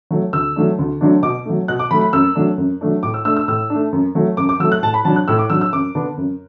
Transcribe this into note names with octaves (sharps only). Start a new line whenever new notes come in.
F#3 A3
D2 E6
D3 F#3 A3 D4
D2
D3 F#3 A3 D4
B2 D6
F#3 A3
B2 F#6
D6
F#3 A3 B5
B5
F#2 E6
F#3 A3 D4
F#2
F#3 A3 D4
A2 D6
E6
A3 D4 E6
E6
A2 E6
A3 D4
F#2
F#3 A3
F#2 D6
D6
F#3 A3 E6
F#6
A2 A5
B5
F#3 D4 A5
F#6
A2 E6
D6
F#3 D4 E6
E6
F#2 D6
D3 B3 D4
F#2